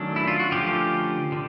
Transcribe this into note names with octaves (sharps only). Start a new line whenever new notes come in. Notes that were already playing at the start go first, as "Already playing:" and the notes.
Already playing: D#3 F#3 A3 C#4 D4
E4
F4
F#4
D3 F3 A3 C#4 F4 G4
D3